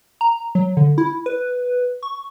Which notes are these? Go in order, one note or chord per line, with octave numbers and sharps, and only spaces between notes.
A#5
F#3
D3
E4
B4
C#6